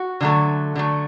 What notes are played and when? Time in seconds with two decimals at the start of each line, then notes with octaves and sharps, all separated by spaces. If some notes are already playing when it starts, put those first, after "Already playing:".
Already playing: F#4
0.21 D3 F#3 A3
0.75 D3 F#3 A3